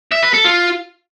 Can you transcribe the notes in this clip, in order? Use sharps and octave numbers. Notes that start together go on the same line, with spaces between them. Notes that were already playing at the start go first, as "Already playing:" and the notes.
E5
B4
A4
F4